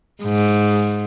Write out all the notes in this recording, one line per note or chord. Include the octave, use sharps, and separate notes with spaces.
G#2